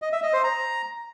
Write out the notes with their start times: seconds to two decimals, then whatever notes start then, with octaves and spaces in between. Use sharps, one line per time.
0.02 D#5
0.12 E5
0.23 D#5
0.33 C5
0.44 A#5